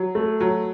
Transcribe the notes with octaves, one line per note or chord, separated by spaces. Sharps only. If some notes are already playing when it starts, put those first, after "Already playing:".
Already playing: F#3
A3
F#3